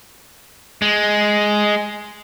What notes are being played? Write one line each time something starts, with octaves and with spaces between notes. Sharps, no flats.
G#3